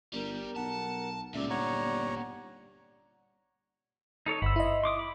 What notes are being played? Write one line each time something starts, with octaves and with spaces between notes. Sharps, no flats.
G1 G3 A#4
B1 F#5 A5
C#2 A#2 G3 D5 E5
G1 C#5 F#5 A#5
D#4 A4 C#5
G1 C5 B5 E6
E4 D#5
C6 D6 D#6
B5 D6